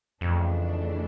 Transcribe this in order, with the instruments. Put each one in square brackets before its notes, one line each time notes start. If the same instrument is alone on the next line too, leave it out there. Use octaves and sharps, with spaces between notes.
[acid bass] F2 [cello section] C#3 E3 A3 D4